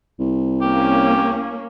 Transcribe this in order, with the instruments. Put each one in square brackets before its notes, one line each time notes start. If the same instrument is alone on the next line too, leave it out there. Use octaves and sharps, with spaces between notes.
[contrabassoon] C2
[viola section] A#3 C#4 [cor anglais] G4